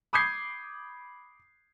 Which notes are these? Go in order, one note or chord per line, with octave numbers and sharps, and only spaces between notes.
B5 D6 D#6 G6 G#6 C7